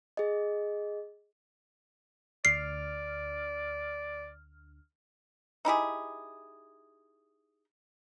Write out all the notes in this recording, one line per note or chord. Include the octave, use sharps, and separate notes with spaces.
G#4 D#5
D2 D5 F6 C7
D#4 E4 G4 G#4